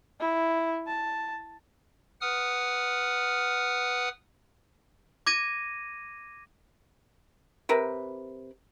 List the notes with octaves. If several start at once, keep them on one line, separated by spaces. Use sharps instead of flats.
E4
A5
B4 F#5 D#6 F6
D6 G#6 A#6 D#7
C3 A#4 B4